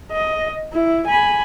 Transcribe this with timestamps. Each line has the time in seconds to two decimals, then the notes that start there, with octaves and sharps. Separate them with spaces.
0.12 D#5
0.73 E4
1.07 G#5 B5